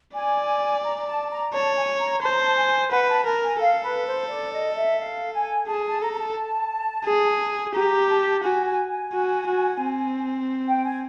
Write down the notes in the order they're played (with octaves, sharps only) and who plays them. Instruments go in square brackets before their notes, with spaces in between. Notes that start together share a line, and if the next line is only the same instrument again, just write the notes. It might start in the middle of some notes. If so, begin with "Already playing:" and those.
[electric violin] D5 [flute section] G#5
[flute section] A#5
A5
A#5
[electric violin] C#5 [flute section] A5
[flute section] G#5
A#5
[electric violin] C5 [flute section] A5
[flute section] A#5
A5
G#5
[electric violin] B4 [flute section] F#5
[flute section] A5
[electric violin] A#4 [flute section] A5
[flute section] G#5
[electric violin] A4 [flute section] F5
[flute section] B4
C5
D5
D#5
E5
F5
G#5
[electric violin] G#4 [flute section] A5
[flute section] A5
[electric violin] A4 [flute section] A#5
[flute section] A#5
A5
[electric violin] G#4
[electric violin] G4 [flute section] A#5
[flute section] A5
[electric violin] F#4 [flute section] G#5
[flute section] G#5
G#5
[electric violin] F#4
F#4
C4
[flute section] G5
G#5